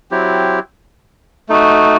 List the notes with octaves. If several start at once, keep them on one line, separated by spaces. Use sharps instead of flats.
F#3 C4 E4 G4
A3 D#4 F#4